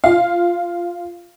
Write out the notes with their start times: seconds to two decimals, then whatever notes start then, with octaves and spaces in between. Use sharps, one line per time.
0.04 F4 F5